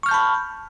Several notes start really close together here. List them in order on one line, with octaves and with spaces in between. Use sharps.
C#6 F6 G6 A5 B5